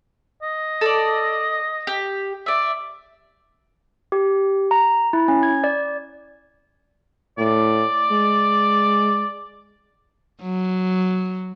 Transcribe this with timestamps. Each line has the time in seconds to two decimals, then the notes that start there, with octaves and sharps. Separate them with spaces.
0.42 D#5
0.81 A4 D5
1.87 G4
2.46 D5 E5
4.12 G4
4.71 A#5
5.13 E4
5.28 C#4
5.43 G#6
5.64 D5
7.38 A2 D5
8.11 G#3
10.42 F#3